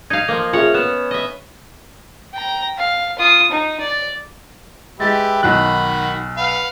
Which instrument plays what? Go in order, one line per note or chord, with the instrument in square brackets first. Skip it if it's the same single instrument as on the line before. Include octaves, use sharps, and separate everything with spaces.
[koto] D#4 F5 [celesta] G#6 D#7
[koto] F3 A#3
[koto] C#4 C#5 F#5 [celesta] F4 G#4 E5
[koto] B3 [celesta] F#6 E7
[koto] D#5 E5
[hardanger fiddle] G5 A#5
F5
F4 D#6
D#4
D5
[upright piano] G#3 A6 [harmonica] G4 B4 E5
[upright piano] B1 F#3 F#6 [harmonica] D#3 F#4 B5
[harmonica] B4 F5 F#5